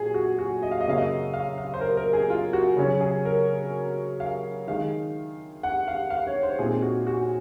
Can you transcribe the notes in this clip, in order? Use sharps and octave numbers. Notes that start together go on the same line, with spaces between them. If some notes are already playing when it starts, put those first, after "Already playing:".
Already playing: A#2 F#3 G#4
F#4
F#4
D#5
F5
D#5
F#2 C#3 F#3 A#3 C#4 F5
D#5
F5
F5
C5
A#4
A#4
G#4
F4
F#4
C#3 F#3 C#4 F#4
G#4
A#4
F5
D#3 G#3 D#4 F5
F#5
F5
F5
C#5
C5
A#2 G#3 C4 D#4 G#4
F#4
F#4